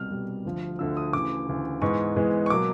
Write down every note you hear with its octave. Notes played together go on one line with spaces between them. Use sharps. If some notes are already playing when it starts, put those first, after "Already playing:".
Already playing: C2 B2 G3 F6
C2 B2 G3
D2 D3 F3
D2 D3 F3 E6
D#6
D2 C#3 E3 D6
D2 C#3 E3
G#2 E3 G#3 B3 C#6
G#2 E3 G#3 B3
C#6
B2 F#3 A#3 D6